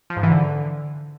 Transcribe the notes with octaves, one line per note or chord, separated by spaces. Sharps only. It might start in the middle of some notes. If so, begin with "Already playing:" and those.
F3
G#2
E3
D3